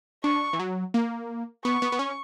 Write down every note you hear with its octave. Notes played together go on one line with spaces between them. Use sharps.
D4 C#6
E3
F#3
A#3
B3 C#6
B3
B3
C#4